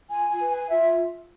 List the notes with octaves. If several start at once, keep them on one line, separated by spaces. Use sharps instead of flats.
F4 G#5
G#5
B4
G#5
F4 E5